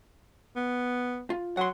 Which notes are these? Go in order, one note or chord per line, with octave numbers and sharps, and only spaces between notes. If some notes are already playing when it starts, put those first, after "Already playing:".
B3
F4
F#3 F#5 C6